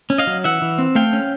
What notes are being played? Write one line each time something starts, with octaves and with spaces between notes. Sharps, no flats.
C#4
D#5 F5
F#3
E3 E5 F#5
E3
C4
A3 F5 G5
C#4